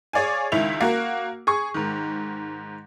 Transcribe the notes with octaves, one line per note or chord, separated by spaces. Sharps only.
G#4 C#5 D5 F5 G#5
C#2 D#3 E4 F7
A#3 F#4 A#4
G#4 C#6
G#2 D#3